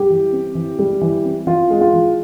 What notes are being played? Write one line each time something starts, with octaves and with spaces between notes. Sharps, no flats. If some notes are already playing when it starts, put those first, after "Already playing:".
Already playing: G3 G4
E3
C4
E3
G3
E3
C4
E3 F4
G#3
F4
E3